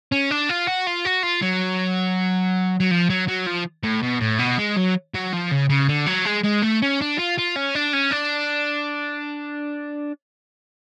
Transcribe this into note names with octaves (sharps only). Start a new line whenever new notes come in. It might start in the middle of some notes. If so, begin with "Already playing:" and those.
C#4
D4
F4
F#4
F4
F#4
F4
F#3
F#3
F3
F#3
F#3
F3
A2
B2
A2
B2
G#3
F#3
F#3
F3
C#3
C#3
D3
F#3
G#3
G#3
A3
C#4
D4
F4
F4
C#4
D4
C#4
D4